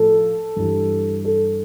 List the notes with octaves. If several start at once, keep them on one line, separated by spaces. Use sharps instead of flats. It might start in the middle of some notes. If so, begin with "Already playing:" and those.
Already playing: A2 F3 A4
G2 E3 G3
A4